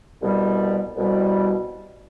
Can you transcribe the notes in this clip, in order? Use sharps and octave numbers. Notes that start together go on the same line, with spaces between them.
C2 B2 G3
C2 B2 G3